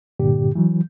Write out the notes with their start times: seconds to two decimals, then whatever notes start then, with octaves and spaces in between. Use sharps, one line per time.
0.20 G2 A#2 D3 G4
0.55 E3 F#3